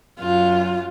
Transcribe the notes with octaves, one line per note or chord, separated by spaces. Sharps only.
F#2 F4